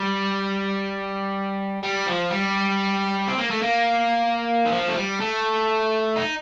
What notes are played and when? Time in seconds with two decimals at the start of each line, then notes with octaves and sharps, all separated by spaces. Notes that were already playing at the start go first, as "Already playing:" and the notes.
Already playing: G3
1.83 G3
2.07 F3
2.30 G3
3.28 C4
3.38 A#3
3.50 A3
3.62 A#3
4.65 D#3
4.71 F3
4.87 A3
4.96 G3
5.20 A3
6.16 D#4